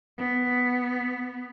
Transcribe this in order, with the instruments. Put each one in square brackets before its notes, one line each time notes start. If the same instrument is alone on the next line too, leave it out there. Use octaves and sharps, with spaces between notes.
[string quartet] B3